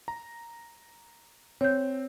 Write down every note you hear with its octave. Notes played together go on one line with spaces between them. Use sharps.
A#5
C4 C#5 G6